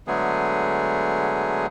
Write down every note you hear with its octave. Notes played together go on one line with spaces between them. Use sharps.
D3 F#3 G#3 A3 B3 G#4